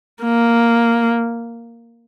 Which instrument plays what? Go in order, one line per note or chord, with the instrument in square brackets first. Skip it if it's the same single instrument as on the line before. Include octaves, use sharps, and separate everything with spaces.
[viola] A#3